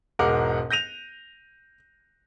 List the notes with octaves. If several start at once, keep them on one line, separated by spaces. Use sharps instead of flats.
E1 G#2 G#3 A#4 F#5 D6
G6 A#6 D#7 F7